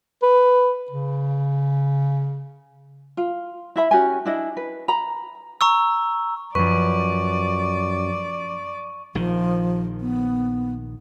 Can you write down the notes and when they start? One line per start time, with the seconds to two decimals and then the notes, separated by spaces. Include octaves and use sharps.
0.22 B4
0.90 C#3
3.17 F4
3.76 E4 E5 B5
3.91 C#4 F#4 G4 G#5
4.25 D4 E4 D#5
4.57 B4
4.88 A#5 B5
5.61 A#5 C#6 E6
6.55 F#2 F3 B4 D5 C#6
9.15 A#1 D#3 F3
10.01 B3